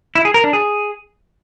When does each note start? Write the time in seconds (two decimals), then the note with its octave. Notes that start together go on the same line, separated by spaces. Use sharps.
0.15 E4
0.25 G#4
0.34 A#4
0.44 D4
0.53 G#4